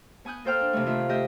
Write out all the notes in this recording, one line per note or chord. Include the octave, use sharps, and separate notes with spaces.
B3 G#5 D#6 F#6 G6
A#3 A4 C5 G5 F6
D4
C3 E3 A3
D#3 A3 F4 E5
A3 G4 D#5 E5 G6